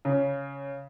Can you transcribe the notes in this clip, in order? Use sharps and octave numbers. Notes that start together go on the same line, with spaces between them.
C#3